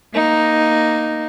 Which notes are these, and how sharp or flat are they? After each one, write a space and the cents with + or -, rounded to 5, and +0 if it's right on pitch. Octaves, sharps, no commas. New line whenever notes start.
A#3 +0 D#4 +0